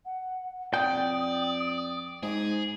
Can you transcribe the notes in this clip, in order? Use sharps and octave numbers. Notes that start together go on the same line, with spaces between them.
F#5
F2 D5 G5 D#6
G#2 G#4